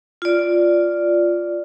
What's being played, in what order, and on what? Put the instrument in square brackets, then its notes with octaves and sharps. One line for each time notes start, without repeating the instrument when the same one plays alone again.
[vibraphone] F4 D5